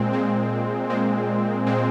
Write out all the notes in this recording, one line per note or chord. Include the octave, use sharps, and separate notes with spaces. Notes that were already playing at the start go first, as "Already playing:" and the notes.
Already playing: A#2 G#3 C4
A#2 G#3 C4
A#2 G#3 C4
A#2 G#3 C4